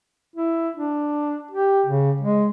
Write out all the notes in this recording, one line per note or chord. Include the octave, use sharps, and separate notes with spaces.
E4
D4
G4
C#3
G#3